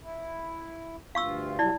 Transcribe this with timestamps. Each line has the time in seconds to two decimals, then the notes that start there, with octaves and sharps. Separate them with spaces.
0.01 E4
1.15 D2 G2 F4 F5 C#6 E6
1.59 C3 F#3 G3 E4 D5